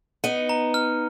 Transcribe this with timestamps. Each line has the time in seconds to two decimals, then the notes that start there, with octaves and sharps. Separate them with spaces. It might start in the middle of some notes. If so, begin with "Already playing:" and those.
0.24 B3 D#4 D#7
0.49 A#5
0.74 F6